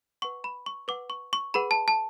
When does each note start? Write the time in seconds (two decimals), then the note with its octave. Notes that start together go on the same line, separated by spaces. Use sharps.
0.22 B4 F#5 C#6
0.44 B5
0.66 C#6
0.88 B4 F#5 D6
1.10 C#6
1.33 C#6
1.54 G#4 B4 F#5 B5
1.71 A5
1.88 A5